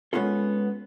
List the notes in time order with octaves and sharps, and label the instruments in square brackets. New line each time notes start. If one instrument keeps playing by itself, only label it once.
[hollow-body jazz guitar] G#3 A3 B3 C#4 F4 A4